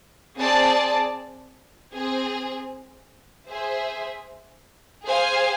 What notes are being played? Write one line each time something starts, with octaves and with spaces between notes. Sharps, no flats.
C4 G#4 D5 A5
C4 G#4 C5
G#4 C5 E5
G#4 C5 F5 G#5